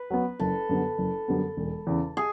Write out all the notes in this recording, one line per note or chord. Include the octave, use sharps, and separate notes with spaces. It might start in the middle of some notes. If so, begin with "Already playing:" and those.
Already playing: B4
F#3 B3
F#1 A4
F#2 D3 G3 B3
F#1
F#2 D3 G3 B3
E1
E2 C#3
G#4